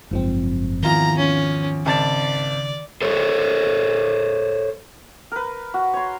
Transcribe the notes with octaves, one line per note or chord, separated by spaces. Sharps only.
F#1 G#2 F3 C4
E2 D#3 F4 A#5 G7
C#4
G#1 C#3 D5 A5 A6
A4 C5 C#5
A#4 B4
F#4
C#5 C6